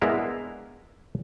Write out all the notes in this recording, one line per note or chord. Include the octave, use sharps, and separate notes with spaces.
G#3 B3 D4 E4 A#4 F5